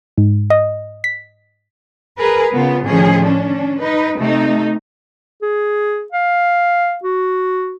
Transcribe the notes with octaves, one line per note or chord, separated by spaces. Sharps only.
G#2
D#5
B6
G#4 A#4 B4
C#3 B3 F4
A2 D3 D#3 F3 C#4 G#4
C#4 D4
D#4 B4
C3 A3 D#4
G#4
F5
F#4